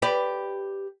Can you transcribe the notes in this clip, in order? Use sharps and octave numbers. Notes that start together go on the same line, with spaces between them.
G4 B4 D5